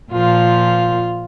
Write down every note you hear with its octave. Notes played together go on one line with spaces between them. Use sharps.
A#2 F3 F4